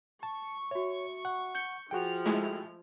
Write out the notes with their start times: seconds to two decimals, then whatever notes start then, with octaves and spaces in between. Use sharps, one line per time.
0.23 A5 C#6
0.71 F#4 C#5 E5
1.25 F#5
1.55 G6 C#7 G7
1.91 F3 F#4 G#4 G5 F6
2.26 G#3 A3 E4